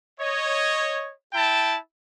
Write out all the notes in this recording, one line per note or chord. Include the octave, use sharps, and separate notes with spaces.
C#5 D#5
E4 G5 A5